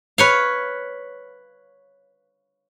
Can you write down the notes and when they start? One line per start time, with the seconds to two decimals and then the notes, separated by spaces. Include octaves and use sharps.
0.18 B4 C#5 F5